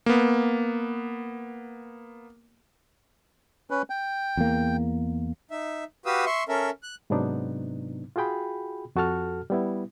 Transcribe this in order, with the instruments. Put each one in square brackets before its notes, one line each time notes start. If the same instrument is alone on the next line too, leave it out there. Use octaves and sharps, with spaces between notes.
[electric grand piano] A#3 B3
[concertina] C#4 B4
G5
[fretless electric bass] E2 A#3
[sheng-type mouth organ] D#4 E5
F#4 G4 B4 F5 D#6 E6
E5 C6 C#6
C#4 A4 A#4 E5
F#6
[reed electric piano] G#2 C3 F#3 B3 D4 D#4
F4 F#4 G#4 G5 B5
F2 F#4 A4 A5 F6
G3 B3 E4